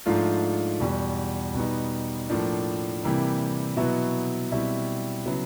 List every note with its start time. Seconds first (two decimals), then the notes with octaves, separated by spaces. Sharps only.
0.06 G#2 F3 A3 D4 F4
0.80 E2 B2 G3
1.54 B2 G3 B3 D#4
2.29 A2 F3 A#3 D4
3.02 C3 E3 G3 A#3
3.77 B2 F#3 B3 E4
4.51 B2 G3 C4 E4
5.26 C#3 F#3 B3 E4